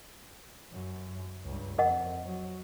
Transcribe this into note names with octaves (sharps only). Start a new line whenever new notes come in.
F#2
C#2 G2
F2 A#4 D#5 F#5
F#3